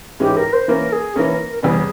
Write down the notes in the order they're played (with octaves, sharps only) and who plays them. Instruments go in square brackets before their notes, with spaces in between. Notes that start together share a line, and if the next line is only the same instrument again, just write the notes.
[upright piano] G#2 E3 G#3 C#4 [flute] G4
[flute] A#4
C5
[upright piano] E3 A#3 C#4 [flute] A#4
[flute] G#4
[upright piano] E3 A#3 C#4 [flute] A#4
[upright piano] E2 C#3 G3 C#4 [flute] G#4